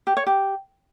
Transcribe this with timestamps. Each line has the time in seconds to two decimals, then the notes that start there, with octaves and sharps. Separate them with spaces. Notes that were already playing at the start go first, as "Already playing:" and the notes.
0.07 G4
0.17 C#5
0.26 G4